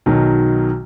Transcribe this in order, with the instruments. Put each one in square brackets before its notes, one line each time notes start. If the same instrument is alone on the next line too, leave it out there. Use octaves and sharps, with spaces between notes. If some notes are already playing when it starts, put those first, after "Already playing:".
[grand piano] B1 D#3 F#3